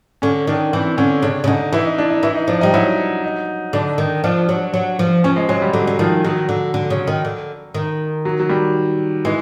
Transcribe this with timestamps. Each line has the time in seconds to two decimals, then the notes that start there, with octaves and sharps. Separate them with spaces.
0.22 D3 C#4
0.47 D#3 D4
0.73 E3 C4
0.98 D3 C#4
1.23 C#3 D4
1.44 C#3
1.47 D3 D#4
1.73 E3 E4
1.85 D#4
1.98 D4
2.10 D#4
2.23 E3 E4
2.35 D#4
2.48 F3 D4
2.61 G3 D#4
2.74 F#3 E4
3.24 D#4
3.73 D3 D4
3.98 D#3
4.24 F3 D4
4.49 F#3
4.74 F#3
4.99 F3
5.24 F3 C#4
5.36 G#3
5.49 F#3 G#3
5.62 G3
5.73 D3 F#3
5.87 D3
5.99 D#3 F3
6.24 D#3 F#3
6.49 D3
6.74 D3
6.90 C#3
7.07 D#3
7.25 D3
7.74 D#3
8.25 F#3
8.40 F#3
8.49 G3
9.25 E3 G#3